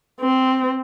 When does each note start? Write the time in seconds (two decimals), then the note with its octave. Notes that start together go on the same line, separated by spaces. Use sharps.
0.21 C4